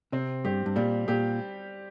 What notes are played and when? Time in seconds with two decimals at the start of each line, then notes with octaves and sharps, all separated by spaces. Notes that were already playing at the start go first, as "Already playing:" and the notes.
0.12 C3 C4
0.45 G2 G4
0.66 G2
0.76 A#2 G3
1.08 A#2 G4